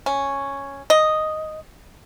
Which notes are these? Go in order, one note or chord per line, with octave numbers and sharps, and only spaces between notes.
C#4
D#5